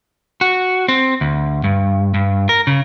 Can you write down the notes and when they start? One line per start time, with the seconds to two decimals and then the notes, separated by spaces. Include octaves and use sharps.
0.41 F#4
0.88 C4
1.21 D2
1.64 G2
2.14 G2
2.49 A#4
2.67 C#3